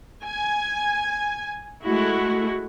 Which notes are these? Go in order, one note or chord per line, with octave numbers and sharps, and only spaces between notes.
G#5
G#3 A3 E4 F#4